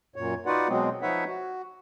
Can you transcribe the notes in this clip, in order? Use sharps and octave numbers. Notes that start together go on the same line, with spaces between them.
F#2 A#2 C#5
D#4 F4 F#4 B4 D5 F#5
B2 F#3 G#3 B3 C4
F3 D#4 B4 C#5 E5 F#5
F#4